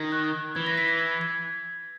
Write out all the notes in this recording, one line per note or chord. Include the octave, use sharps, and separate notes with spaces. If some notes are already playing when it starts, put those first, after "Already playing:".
Already playing: D#3 G#6 A#6
F#6
E3 G#6
A#6
B6
A#6
G#6
G#6